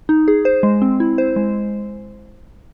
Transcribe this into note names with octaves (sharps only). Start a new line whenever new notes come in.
D#4
G#4
C5
G#3
C4
E4
C5
G#3